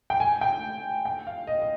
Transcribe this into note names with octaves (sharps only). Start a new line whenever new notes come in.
G5
G#5
G5
G5
F5
D#5
D#5